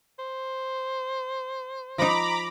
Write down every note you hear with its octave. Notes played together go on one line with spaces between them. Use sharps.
C5
F3 D#4 A#5 B5 D6